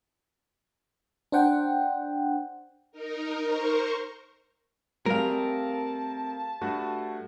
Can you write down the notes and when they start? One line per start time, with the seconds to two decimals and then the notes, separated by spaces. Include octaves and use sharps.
1.32 D4 C5 F#5 G5
2.92 D#4 A#4
3.46 A#4 C5 C#6
5.06 G3 A3 C4 G#4 A#4 F5 A5
6.61 G2 A3 F#4